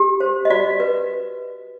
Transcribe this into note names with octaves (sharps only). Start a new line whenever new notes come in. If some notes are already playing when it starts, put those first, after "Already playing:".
Already playing: G4
C5
D#5
F#4 D5
B4